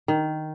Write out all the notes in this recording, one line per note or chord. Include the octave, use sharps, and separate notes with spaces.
D#3